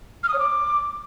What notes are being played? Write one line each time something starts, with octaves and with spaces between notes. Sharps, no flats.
F6
D#6
C#5
D6